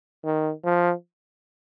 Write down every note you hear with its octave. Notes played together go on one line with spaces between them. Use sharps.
D#3
F3